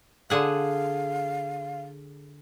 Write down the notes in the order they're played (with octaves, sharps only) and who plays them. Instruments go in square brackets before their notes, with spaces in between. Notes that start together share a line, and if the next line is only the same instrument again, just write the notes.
[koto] D3 G#4 F#5 [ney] F5